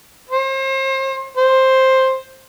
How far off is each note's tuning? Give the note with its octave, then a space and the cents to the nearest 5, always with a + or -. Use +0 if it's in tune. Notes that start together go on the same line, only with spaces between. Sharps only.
C5 +35
C5 +5